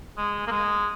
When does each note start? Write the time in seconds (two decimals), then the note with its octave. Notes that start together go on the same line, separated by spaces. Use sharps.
0.18 G#3
0.47 A#3
0.51 G#3